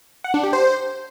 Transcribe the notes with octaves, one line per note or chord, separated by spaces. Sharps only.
F#5
D4
G4
C5